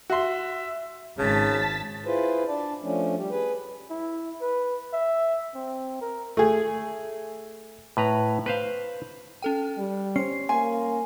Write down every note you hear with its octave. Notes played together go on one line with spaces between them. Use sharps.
F#4 E5 C6
G#1 C#3 A5 A6 B6
E4 F4 G#4 B4 C5
D4 D5 A5
F3 A3 C#4 D4
G3 G4
G#4 B4
E4
B4
E5
C4
A#4
A3 G#4
A2 B4 A#5
B4 C5 F5
C#4 A4 G5
G3
C#4 C5 C7
A#3 G#5 C6